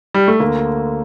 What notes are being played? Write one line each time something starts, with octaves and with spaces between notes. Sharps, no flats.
G3
A3
D2 D3 A#3